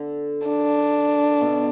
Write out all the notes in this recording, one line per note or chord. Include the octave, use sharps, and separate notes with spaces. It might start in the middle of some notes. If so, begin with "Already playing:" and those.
Already playing: D3
D4
B2